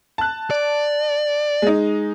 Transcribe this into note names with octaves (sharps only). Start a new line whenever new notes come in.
A5 F#6
D5
G#3 D#4